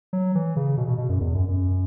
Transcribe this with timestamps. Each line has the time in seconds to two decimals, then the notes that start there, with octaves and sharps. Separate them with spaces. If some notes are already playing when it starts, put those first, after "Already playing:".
0.13 F#3
0.35 E3
0.56 C#3
0.77 B2
0.88 B2
0.98 B2
1.09 F#2
1.21 E2
1.35 F#2
1.49 F#2